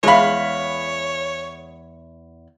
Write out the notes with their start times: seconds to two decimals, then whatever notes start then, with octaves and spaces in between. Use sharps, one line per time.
0.03 E2 G#3 C#5 F5 B5